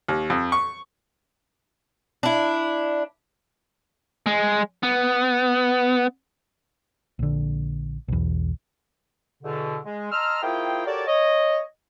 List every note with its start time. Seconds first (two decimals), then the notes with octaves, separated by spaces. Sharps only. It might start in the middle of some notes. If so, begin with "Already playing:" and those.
0.09 D#2
0.30 F2
0.52 C#6
2.23 D4 E4
4.26 G#3
4.83 B3
7.19 A#1 D3
8.08 B1 E2
9.43 E2 B2 D3
9.85 G#3
10.12 D#5 A5 A#5 C6 E6 F6
10.42 A#3 E4 F4 G#4 C5 G5
10.86 F#4 G4 A4 A#4 C#5 D5
11.07 C#5 D#5